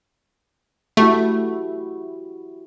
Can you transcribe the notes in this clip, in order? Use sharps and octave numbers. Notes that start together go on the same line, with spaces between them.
A3 E4 F#4 G4